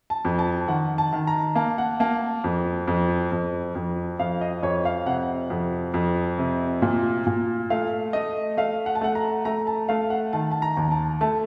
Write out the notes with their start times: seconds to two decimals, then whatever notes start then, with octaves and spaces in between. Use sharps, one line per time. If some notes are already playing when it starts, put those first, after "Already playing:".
0.10 A5
0.25 F2
0.39 A5
0.68 D#3 F#5
0.98 A5
1.13 D#3
1.27 A#5
1.55 A#3 A5
1.78 F#5
2.00 A#3 A5
2.44 F2
2.88 F2
3.32 F2
3.75 F2
4.19 F2 F5
4.41 D#5
4.63 F2 C#5
4.85 F5
5.06 C3 F#5
5.50 F2
5.94 F2
6.39 C3
6.82 A#2
7.27 A#2
7.70 A3 F5
8.13 A3 D#5
8.57 A3 F5
8.86 F#5
8.95 A5
9.01 A3 F#5
9.15 A#5
9.45 A3 A#5
9.67 A5
9.89 A3 F5
10.10 F#5
10.33 D#3 A5
10.51 A5
10.62 A#5
10.77 D#2
10.91 A5
11.21 A3 A5